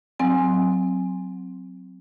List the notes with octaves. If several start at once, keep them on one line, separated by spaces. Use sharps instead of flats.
F#3 C4 G#5